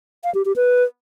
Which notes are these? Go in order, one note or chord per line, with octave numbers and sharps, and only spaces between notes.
F5
G4
G4
B4